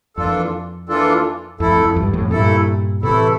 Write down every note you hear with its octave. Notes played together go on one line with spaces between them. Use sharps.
F2 E3 A#3 D4 F4 A4
E3 A#3 D4 F4 A4
F2 A3 E4 A4
F2
E2 G2
F2 A2
G2 A#2 A3 E4 A4
A2 C3 E3 A3 E4 A4